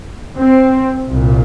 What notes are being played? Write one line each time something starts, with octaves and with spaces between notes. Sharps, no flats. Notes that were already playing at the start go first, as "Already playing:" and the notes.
C4
C2 A#2